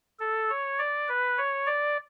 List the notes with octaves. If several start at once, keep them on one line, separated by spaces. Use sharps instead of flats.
A4
C#5
D5
B4
C#5
D5